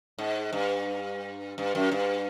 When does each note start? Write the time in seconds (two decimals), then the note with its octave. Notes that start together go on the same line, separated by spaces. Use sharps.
0.19 G#2
0.53 G2
1.58 G2
1.75 F#2
1.92 G2